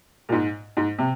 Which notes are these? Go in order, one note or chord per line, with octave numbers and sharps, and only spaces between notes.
A#2
G#2
G#2
C3